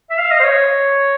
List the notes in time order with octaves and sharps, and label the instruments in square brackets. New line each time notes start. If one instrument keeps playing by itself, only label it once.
[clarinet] E5
F5
D#5
C5
C#5